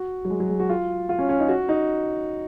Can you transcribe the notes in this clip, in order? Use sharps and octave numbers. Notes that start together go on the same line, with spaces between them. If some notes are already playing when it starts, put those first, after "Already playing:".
Already playing: F#4
F#3
G#3
F#3
G#3
F#4
F4
F4
C#4
C#4
D#4
F#4
D#4